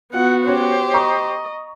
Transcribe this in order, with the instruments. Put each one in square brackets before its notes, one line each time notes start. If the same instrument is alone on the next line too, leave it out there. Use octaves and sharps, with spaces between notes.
[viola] B3 F#4 [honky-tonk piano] F4 [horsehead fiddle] F#5
[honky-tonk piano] C#4 C#5 [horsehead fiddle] G4 C5
[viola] D#5 [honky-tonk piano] A#5 C#6 D#6